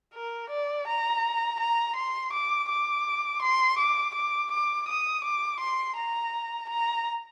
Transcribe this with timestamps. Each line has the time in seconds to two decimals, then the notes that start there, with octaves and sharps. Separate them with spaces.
0.14 A#4
0.50 D5
0.87 A#5
1.60 A#5
1.96 C6
2.32 D6
2.69 D6
3.42 C6
3.78 D6
4.14 D6
4.51 D6
4.88 D#6
5.24 D6
5.60 C6
5.97 A#5
6.69 A#5